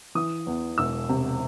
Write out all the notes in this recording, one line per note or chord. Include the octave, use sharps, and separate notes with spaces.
E3 D#6
E2
E1 E6
C3